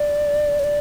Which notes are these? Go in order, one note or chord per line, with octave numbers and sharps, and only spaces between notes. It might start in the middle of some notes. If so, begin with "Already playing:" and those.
Already playing: D5
C#5
D5